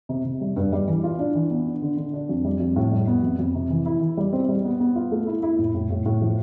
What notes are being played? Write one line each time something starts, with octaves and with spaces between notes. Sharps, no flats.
C3
C3
G3
G2
G3
E3
F4
D4
E3
B3
D4
D3
D3
D4
F2
G3
F2
A2
G3
B3
F2
F2
C3
E3
E4
E3
G3
C4
G3
B3
B3
F4
A3
E4
E4
A2
A2
A2
A2
F3